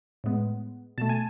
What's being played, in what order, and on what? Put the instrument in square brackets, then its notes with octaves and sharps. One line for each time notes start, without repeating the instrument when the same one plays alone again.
[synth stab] A2 G#3 B3
B2 A3 A5
G#5